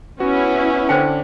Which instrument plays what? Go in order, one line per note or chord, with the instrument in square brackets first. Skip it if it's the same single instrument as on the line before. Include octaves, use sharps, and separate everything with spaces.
[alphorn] B3 [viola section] C#4 E4 [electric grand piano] F#4
[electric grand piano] D3 D4 [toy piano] C5 G5